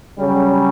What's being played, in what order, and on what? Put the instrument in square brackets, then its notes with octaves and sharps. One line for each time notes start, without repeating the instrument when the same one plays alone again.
[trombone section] C#3 F#3 G3